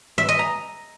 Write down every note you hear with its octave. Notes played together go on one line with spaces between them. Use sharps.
E5
D#5
A#5